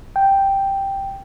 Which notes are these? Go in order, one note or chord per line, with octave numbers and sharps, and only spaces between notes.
G5